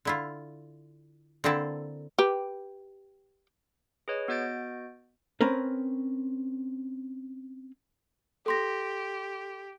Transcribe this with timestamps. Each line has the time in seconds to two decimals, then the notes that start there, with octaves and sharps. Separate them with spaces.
0.05 D3 E4 F4
1.44 D3 A#3 C4 E4 A4
2.19 G4 B4
4.08 G#4 B4 C#5 D#5
4.28 B3 F#4 D#5 G6 A6 D7
5.41 C4 C#4 A#4 B4
8.46 G4 A4 C6 A#6